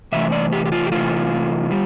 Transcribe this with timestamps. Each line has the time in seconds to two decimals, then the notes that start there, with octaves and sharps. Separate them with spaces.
0.12 C3 E3 A3 E5
0.32 D5
0.53 G4
0.66 G4
0.72 F4
0.86 G4
0.92 C3 E3 A3 F4
1.71 G3